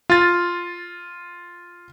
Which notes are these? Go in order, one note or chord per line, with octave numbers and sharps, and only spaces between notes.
F4 A6